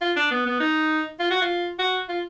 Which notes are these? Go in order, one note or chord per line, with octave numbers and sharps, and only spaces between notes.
F4
D4
B3
B3
D#4
F4
F#4
F4
F#4
F4